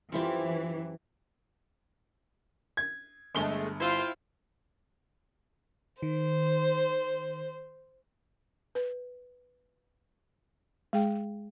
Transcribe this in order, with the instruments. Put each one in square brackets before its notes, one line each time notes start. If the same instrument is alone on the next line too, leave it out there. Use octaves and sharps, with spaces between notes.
[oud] F#2 G4 C5 [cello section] E3 [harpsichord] C4 E4 F4
[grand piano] G#6
[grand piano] G1 G7 [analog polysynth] G#3 A3
[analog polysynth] E4 F5 G5 [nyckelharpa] F4 C5
[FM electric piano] D#3 [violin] C5
[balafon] B4
G#3 G#4 G5